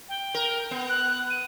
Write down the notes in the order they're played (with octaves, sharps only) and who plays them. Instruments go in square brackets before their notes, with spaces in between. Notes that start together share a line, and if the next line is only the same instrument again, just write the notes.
[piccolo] G5
[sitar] A#4
B3
[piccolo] F#6
D#7